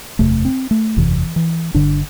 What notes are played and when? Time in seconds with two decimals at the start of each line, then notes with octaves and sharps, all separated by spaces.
0.19 F#1 E2 C3 A3
0.45 C4
0.71 A3
0.97 F#1 E2 C3 E3
1.36 E3
1.74 G1 G2 D3 D4